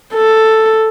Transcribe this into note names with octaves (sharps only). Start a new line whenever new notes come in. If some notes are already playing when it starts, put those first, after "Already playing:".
A4